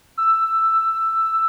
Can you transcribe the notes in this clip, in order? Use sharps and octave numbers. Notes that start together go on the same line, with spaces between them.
E6